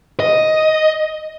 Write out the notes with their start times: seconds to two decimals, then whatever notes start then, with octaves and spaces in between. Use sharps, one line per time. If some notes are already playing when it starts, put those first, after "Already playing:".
0.20 D#5